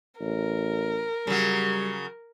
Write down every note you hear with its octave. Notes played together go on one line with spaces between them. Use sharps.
A1 A#4
C#3 F#3 G3